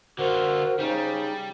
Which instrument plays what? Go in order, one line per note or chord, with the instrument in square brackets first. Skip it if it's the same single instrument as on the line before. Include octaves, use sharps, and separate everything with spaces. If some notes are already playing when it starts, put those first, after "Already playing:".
[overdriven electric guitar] D3 F4 [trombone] F#4 [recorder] A#4 [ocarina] C5
[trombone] C#3 [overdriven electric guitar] G3 [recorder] D#4